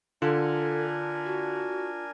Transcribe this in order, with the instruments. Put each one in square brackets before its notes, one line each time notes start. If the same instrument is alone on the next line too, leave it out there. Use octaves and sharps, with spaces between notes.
[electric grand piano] D3 [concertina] D4 A#4 G#5 [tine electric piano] F4 [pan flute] A4
[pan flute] F#4